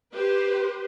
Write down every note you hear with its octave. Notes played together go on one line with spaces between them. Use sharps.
G4 B4 C5